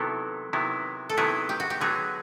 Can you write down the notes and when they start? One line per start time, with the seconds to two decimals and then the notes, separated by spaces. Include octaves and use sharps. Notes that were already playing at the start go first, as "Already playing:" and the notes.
Already playing: C3 D#3 F#3 B3 E4 A4
0.53 C3 D#3 F#3 B3 E4
1.09 A4
1.17 C3 D#3 F#3 B3 E4 G#4
1.49 G4
1.60 F#4
1.70 G4
1.81 D3 F#3 B3 D#4 G#4